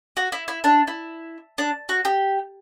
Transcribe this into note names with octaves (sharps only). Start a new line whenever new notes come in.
F#4
E4
E4
D4
E4
D4
F#4
G4